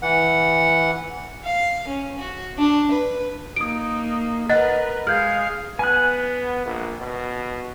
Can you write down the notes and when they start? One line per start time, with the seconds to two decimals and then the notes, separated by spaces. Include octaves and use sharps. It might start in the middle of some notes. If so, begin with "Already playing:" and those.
0.02 E3 F#5
1.45 F5
1.87 C#4
2.19 F#4
2.58 D4
2.91 B4
3.56 A#3 D#4 D#6 D7
4.50 A#4 B4 D#5 F#5 F#6 A6
5.07 G#3 F5 F6 G6 G#6
5.79 B3 G#5 F#6
6.66 A#1
6.99 B2